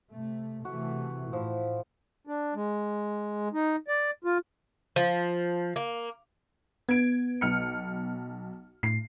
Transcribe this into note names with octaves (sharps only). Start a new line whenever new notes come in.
C3 A3
C3 E3 A3 F#4
A2 F3 E4
D4
G#3
D#4
D5
F4
F3
A#3
B3 G#6 D7
B1 F6 C#7
A2 C7